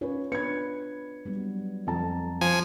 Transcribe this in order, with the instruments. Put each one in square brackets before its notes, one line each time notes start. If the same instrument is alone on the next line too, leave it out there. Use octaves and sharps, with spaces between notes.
[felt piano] C#4 B4 [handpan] F4 C#5
[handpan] B3 D4 B4 [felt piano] G#6 C#7
[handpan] F#3 G3 B3
[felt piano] F2 A5 A#5 [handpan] A4
[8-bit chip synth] F3 G#5